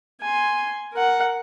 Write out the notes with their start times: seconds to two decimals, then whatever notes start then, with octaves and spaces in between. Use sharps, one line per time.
0.21 G#5 C6
0.93 A#4 F#5